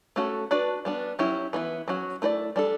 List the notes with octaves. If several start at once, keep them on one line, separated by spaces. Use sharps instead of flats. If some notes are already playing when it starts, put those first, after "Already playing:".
A3 C#4 F#4 A4
D4 F#4 B4 D5
G3 B3 D4
F#3 C#4 E4 G4
E3 B3 E4
F#3 C#4 F#4
A3 E4 B4 D5
G3 D4 A4